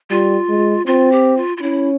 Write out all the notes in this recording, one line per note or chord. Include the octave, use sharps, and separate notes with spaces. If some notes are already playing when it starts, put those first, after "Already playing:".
G3 F4
G#3
C4 F4
G4
F4
F4
C#4 E4